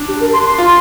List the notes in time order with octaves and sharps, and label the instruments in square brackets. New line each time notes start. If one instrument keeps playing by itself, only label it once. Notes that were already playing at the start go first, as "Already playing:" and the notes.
Already playing: [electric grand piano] D4
[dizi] G4
A#4
C6
C6
[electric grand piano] F4